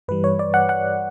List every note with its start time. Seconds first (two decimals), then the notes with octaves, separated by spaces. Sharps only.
0.08 G2 E3 G3 B4
0.24 C#5
0.39 D5
0.54 F#5
0.69 F#5